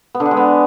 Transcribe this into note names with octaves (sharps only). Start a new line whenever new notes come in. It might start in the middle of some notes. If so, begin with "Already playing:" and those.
B3
D3
D4
G#3
B3